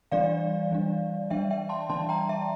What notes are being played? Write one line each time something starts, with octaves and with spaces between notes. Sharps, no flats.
E3 G3 D4 D5 F5
E3 G3 D4
E3 G3 D4 E5 G5
E5 G5
A5 C6
E3 G3 D4 A5 C6
G5 A#5
E5